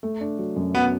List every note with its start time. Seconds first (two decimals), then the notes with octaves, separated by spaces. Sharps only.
0.03 A3
0.21 D4
0.39 F#3
0.56 F#2
0.75 F#3 B3